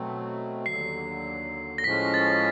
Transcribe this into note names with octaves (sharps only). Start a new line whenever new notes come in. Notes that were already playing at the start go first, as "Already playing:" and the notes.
Already playing: B2 F#3 A3 C4
D#2 D3 F#3 C7
A#6
A2 F3 G#3 C#4 B6
A6